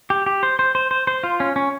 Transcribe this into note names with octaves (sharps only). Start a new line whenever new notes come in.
G4
G4
C5
C5
C5
C5
C5
F4
C#4
C#4